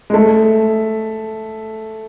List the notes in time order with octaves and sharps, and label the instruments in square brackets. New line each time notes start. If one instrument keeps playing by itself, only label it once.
[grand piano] G#3
A3